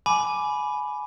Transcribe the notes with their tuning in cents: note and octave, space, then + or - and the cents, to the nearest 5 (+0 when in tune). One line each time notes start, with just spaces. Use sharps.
G#5 +20 B5 +0 D6 +0